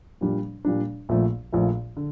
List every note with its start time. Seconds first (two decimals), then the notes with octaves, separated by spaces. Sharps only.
0.21 A#2 G3 D4
0.65 A#2 G3 D4
1.09 A#1 A#2 F3 A3
1.52 A#1 A#2 F3 A3
1.97 D3